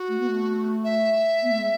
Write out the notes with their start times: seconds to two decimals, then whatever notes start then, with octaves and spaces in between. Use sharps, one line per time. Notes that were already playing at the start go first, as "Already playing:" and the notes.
Already playing: F#4
0.08 A3
0.19 B3
0.27 A3
0.84 E5
1.42 B3
1.50 A3
1.59 G#3